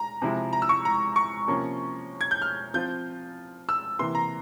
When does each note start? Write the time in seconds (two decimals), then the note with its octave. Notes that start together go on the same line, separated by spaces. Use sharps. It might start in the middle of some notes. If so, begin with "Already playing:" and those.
Already playing: A#5
0.22 C3 F3 G#3 E4
0.53 A#5
0.62 E6
0.69 C#6
0.85 A#5
1.16 C#6
1.48 C3 F3 A#3 C#4
2.21 G#6
2.31 G6
2.42 F6
2.74 F3 C4 F4 G6
3.69 E6
3.99 C3 E3 A#3 C6
4.15 A#5